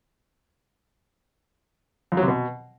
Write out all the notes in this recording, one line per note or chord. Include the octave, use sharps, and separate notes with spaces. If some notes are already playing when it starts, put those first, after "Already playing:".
F2
F#3
C3
B2